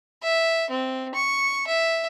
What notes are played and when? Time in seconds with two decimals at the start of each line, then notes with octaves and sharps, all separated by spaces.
0.23 E5
0.70 C4
1.15 C#6
1.67 E5